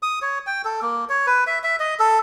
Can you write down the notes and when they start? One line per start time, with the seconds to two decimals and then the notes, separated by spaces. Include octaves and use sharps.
0.03 D#6
0.22 C#5
0.47 G5
0.65 A4
0.82 A#3
1.09 C#5
1.27 B4
1.47 E5
1.63 E5
1.80 D#5
1.99 A4